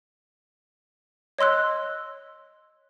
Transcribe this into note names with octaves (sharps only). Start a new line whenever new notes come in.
C#5 D#5 C6 E6 F#6